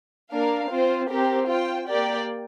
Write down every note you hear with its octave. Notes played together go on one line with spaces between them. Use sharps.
A#3 D4 A#4 F5
C4 F4 C5
C4 G4 A#4
F4 C5 G5
A#3 G4 D5 G5